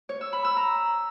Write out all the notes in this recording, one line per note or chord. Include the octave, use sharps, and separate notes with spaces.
C#5
E6
B5
E6
A#5